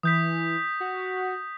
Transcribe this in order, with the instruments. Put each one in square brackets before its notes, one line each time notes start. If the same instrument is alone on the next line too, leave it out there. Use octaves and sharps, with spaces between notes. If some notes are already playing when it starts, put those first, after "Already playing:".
[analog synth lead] E3 [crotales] D#6 G6 B6
[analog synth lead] F#4